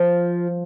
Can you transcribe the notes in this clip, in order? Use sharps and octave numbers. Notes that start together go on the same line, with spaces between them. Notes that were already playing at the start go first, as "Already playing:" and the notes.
Already playing: F3